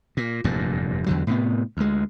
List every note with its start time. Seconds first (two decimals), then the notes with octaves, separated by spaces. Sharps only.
0.17 A#2
0.44 F1 E2 G2 A#2
1.06 E2 D3 F#3
1.27 A2 C3 B3
1.77 D2 G#3